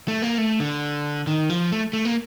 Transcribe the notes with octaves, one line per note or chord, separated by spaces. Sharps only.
A3
A#3
A3
D3
D#3
F3
A3
A3
A#3